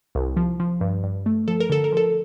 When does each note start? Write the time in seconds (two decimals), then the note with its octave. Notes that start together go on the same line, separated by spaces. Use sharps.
0.15 C2
0.37 F3
0.60 F3
0.81 G2
1.03 G2
1.26 A3
1.48 F3 A4
1.60 A#4
1.70 D3 A4
1.84 A#4
1.92 F3 A4